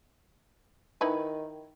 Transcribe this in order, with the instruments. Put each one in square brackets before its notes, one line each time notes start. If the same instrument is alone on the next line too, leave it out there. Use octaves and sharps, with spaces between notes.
[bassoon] D#3 [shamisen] D#4 E4 B4